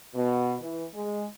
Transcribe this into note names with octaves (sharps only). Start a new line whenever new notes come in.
B2
E3
G#3